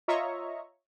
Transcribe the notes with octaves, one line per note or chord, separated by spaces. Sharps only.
F4 C#5 D#5 E5 A#5 C#6